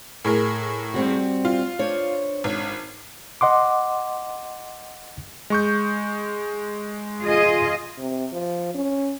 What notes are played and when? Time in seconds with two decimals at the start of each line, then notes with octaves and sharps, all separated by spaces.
0.24 A2 G#4 A#4
0.94 G3 C4 F#4
1.45 F4
1.79 D4 C5 C#5
2.44 G#1
3.41 D#5 F#5 C6 D6
5.50 G#3 C#6 G6
7.23 F4 G#4 D#5
7.98 C3
8.33 F3
8.74 C#4